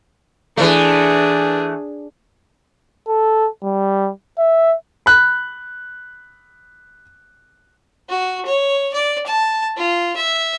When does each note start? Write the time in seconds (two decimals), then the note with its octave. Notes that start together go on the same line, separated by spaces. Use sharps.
0.57 E3 A3 D4 G#4
3.08 A4
3.63 G3
4.38 E5
5.06 B5 F#6
8.09 F#4
8.46 C#5
8.93 D5
9.26 A5
9.77 F4
10.16 E5